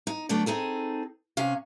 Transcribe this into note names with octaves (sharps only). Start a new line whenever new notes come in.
D#4
D3 F#3 A3 B3 D4
C4 D#4 G#4 A4
C3 C#4 F5